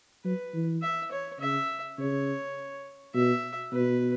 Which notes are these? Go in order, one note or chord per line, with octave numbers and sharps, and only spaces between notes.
F#3 B4
E3
E5
C#5
C#3 E5
C#3 C#5
B2 E5
B2 B4